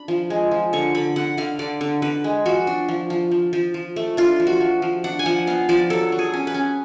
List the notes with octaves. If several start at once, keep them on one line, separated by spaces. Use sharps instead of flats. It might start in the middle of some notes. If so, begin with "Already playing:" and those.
Already playing: D4 B5
F3
G#3
F3
D3 C#6
D3 B5
D3 F#5
D3 F5
D3 D5
D3
D3 B4
G#3
F3 F#4
D4
F3
F3
F3
F3
F3
A3
D4 F4
F3
F#4
F3
F3
D4 F#5
G#5
F3 F#5
B3 F5
F3 D5
F#3 A4
F#3
G#4
C#4
B4
C#4